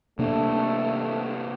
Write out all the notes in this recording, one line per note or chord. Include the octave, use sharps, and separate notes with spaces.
C3 A3 A#3 D4